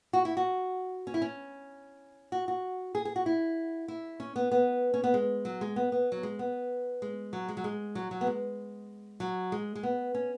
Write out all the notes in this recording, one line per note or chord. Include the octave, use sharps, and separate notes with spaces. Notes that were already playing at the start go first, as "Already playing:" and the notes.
F#4
E4
F#4
C#4
E4
C#4
F#4
F#4
G#4
G#4
F#4
E4
E4
C#4
B3
B3
C#4
B3
G#3
F#3
G#3
B3
B3
F#3
G#3
B3
G#3
F#3
G#3
F#3
G#3
F#3
F#3
B3
G#3
F#3
G#3
G#3
B3
C#4